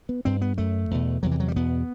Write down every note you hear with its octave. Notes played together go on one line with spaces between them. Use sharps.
B3
G2 C4
B3
F#2 A3
E2 B2
E2 C3 F#3
E3
F#3
G3
E2 B2 B3